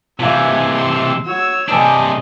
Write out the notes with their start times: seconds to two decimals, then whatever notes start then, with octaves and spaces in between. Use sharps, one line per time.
0.20 C3 E3 F4 B4 E5 F5 G#5
0.73 C6 E6
1.26 F#4 C#5 E6
1.69 C3 D4 B4 D#5 G#5